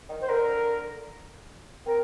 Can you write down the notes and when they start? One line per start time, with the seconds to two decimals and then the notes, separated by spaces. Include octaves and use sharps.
0.09 D#3
0.21 C5
0.28 D3 A#4
1.86 C4 A#4